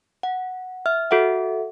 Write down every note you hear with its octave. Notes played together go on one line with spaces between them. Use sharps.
F#5
E5 F6
F#4 A4 E5 F#5